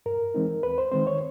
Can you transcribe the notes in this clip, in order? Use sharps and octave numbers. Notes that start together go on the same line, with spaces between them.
G2 A#4
E3 G#3 C4 D#4
D#2 B4
C5
D#3 G#3 C4 C5
C#5